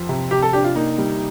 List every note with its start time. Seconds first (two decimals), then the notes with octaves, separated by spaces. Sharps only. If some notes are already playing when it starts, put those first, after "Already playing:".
Already playing: F2 F3
0.09 C3
0.31 C3 G4
0.42 A4
0.53 D4 G4
0.64 F4
0.75 A#3 D#4
0.98 G3